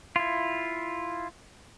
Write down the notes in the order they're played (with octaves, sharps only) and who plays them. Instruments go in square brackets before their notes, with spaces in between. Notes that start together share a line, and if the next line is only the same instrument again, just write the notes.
[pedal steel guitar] E4 F4